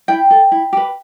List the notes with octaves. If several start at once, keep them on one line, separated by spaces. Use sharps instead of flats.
E4 G5
A4
E4
G4 B4